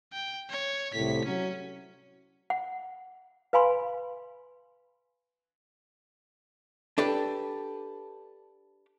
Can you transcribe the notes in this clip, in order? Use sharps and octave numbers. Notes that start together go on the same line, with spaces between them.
G5
C#5
C2 A2 B6
F#3 C#4
F#5
B4 F5 G#5 B5 C6
D4 G4 A4 B4